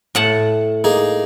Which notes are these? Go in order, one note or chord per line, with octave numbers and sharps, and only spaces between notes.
A2 F#5 A5
A#3 D#4 G#4